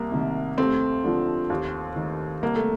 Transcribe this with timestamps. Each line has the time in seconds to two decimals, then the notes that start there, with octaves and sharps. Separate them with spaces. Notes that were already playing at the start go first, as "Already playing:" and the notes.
Already playing: C2 A#3
0.12 C3 D#3
0.58 D#2 A3 C4
1.04 D3 F3
1.50 D#2
1.96 D#3
2.42 C2 A#3
2.56 A3